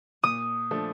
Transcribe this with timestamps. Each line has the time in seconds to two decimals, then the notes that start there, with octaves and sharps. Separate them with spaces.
0.23 A#2 D#6
0.71 F3 A3 D4